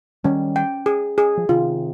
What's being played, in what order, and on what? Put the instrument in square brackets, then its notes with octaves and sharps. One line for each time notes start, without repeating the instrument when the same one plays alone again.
[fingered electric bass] D#3 G3 [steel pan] C#4
[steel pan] G5
G#4
G#4
[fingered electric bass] F3
[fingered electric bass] C3 D#3 [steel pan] F4